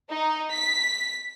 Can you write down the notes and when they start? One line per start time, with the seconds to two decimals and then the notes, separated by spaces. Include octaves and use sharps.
0.11 D#4
0.54 B6